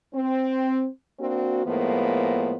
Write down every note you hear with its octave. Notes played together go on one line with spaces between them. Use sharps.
C4
A#3 C4 D4 F#4
A2 F3 G#3 A#3 B3